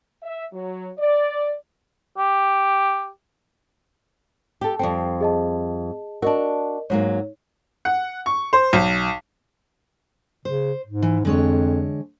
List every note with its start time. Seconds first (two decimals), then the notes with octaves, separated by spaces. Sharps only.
0.23 E5
0.53 F#3
0.98 D5
2.18 G4
4.61 G4 A4
4.79 F2 G3 C4 G5
5.21 G#4 D#5 A5
6.22 D4 F#4 A#4 D#5
6.90 G#2 F#3 A#3 C#5
7.85 F#5
8.26 C#6
8.53 C5
8.73 B1
10.45 C#3 C5
10.86 G#2
11.02 E3
11.25 F2 D3 G#3 C#5